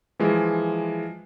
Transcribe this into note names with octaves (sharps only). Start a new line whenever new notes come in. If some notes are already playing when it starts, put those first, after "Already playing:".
E3 F3 G#3